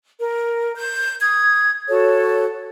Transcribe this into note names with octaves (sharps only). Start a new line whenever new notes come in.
A#4
G6
D#6 G#6
F#4 A4 C#5